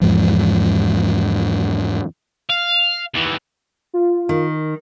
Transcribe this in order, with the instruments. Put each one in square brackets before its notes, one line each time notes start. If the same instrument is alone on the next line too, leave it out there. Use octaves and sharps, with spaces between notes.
[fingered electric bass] E2 G#2 F3
[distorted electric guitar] F5
D#2 E3
[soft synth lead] F4
[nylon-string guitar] D#3